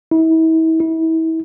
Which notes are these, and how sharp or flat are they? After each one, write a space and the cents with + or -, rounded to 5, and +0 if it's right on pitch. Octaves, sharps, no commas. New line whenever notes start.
E4 -40
E4 -35